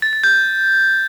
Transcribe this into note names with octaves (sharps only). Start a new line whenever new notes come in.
A6
A6
G6